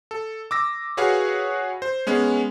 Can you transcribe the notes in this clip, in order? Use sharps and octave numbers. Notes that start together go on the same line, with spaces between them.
A4
D6 E6 A#6
F#4 G#4 B4 C#5 F5 F#5
C5
G#3 B3 C#4